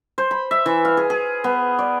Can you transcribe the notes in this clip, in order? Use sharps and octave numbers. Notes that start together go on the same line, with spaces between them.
C5
B5
E5
E3
F5
G#4
G#4
B3
D5